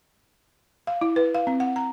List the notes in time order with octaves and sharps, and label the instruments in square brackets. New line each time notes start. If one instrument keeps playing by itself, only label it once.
[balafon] F5
E4
B4
F5
C4
F#5
A#5